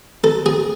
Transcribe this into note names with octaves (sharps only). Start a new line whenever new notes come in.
A4
G#4